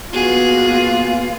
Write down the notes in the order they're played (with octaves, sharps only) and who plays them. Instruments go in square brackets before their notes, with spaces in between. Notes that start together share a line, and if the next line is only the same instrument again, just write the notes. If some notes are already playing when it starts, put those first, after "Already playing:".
[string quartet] A#3 F4 [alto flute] B3 [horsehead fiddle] F#4 [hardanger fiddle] G#4